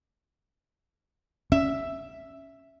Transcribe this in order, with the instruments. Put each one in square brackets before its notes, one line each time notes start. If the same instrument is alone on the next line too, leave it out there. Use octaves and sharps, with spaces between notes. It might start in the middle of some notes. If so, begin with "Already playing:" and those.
[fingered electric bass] C#4 [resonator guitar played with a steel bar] E5